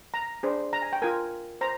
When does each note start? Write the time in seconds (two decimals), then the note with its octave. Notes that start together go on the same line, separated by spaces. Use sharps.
0.14 A#5
0.43 D4 G#4 C5
0.73 A#5
0.82 G#5
0.93 G5
1.02 F4 A#4 G#5
1.61 C5 A#5